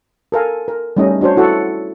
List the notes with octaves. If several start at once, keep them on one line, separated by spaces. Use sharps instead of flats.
A4 A#4 F5 G#5
A#4
G3 A3 C#4 D#4 D#5
D4 F#4 C5 C#5
E4 F#4 A4 F#5